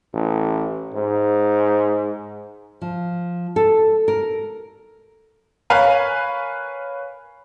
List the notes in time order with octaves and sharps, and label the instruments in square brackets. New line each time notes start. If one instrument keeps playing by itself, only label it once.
[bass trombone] A1
G#2
[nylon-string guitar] F3
A4
A#4
[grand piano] A#4 B4 C#5 F5 G#5